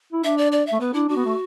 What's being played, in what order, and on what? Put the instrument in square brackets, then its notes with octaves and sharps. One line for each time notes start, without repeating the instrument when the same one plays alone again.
[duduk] E4
[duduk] D4 [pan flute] E5
[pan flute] D5
D5
E5
[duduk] A3
[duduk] B3 [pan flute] B4
[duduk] D4 [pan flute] E4
[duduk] D4 [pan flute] F#4
[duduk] B3
A3